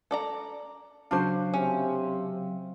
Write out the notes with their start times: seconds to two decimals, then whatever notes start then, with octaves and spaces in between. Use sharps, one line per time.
0.11 A4 D5 A#5
1.11 C#3 F#3 D4 F#4 C5 F5
1.54 C3 C#4